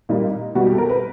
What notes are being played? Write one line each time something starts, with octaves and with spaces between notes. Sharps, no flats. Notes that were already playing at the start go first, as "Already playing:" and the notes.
A#2 G3 A#3 D#4
B2 G3 B3 F#4
G4
A4
A#4
B4